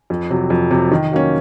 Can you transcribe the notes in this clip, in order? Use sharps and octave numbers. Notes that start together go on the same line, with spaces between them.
F2
C3 F#3
F2
C3 F#3
D#3
F#3 A#3 C#4